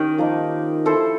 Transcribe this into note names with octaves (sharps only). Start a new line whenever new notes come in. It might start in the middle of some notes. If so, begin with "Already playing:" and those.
Already playing: D#3 C#4 G4 C5
F3 A#3 D#4
E4 A4 C5 E5